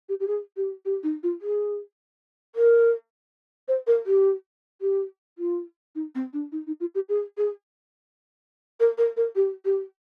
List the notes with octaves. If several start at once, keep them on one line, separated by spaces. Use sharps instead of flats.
G4
G4
G#4
G4
G4
D#4
F4
G#4
A#4
C5
A#4
G4
G4
F4
D#4
C4
D4
D#4
D#4
F4
G4
G#4
G#4
A#4
A#4
A#4
G4
G4